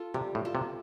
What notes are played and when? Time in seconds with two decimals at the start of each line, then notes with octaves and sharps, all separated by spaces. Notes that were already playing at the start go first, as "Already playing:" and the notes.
Already playing: F4 A4
0.14 C3 G3
0.35 A2
0.45 F4 A4
0.55 C3